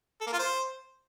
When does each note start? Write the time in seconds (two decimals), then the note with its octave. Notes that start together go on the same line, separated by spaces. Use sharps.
0.21 A4
0.27 A#3
0.33 F4
0.39 C5